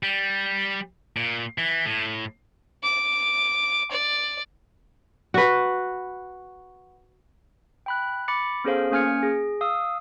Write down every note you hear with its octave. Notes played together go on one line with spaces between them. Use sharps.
G3
A#2
E3
A2
D6
D5
F#4 B4
G5 B5 F#6
B5 D6 A6 C#7
B3 C#4 G#4 A4 C5 F5
A#3 C#4 G#5 F6 G#6 C#7
G#4
F5 D#6 E6